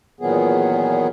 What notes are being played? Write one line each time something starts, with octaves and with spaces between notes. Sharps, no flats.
E2 A#2 D#3 F#3 B3 G#4